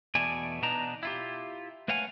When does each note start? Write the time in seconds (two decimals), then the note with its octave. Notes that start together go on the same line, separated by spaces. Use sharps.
0.15 E2 B2 A3 D5 G#5
0.62 B2 B3 D4 D#4 A#5
1.03 E4 F4 G4
1.88 A3 B4 C#5 F5 F#5 G#5